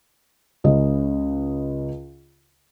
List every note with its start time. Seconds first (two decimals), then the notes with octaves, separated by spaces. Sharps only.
0.64 C#2 C#3 D#5